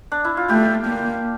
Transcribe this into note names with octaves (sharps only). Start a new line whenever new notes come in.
D4
E4
F4
A3 G4
A#3